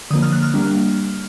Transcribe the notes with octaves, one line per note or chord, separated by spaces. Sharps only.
D3 F3 A#3 D#6
F6
F#6
F6
G3 A#3 D4